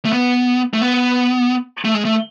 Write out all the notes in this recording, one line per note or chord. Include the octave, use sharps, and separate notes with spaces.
A3
B3
A3
B3
A3
G#3
A3